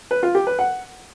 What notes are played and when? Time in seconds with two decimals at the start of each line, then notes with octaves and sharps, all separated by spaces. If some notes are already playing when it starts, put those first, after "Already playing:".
0.11 B4
0.23 F4
0.35 G4
0.47 B4
0.59 F#5